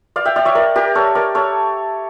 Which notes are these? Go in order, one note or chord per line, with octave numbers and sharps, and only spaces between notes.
D5 F5
E5 G5
D5 F5
C#5 E5
A#4 D5
G4 A#4
A4 C#5
A#4 D5
A4 C#5